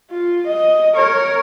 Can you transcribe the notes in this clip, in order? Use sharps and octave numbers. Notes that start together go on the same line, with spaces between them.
F4
D#5
A#4 C#5